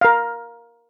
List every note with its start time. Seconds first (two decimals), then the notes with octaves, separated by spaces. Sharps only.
0.01 A#4 F5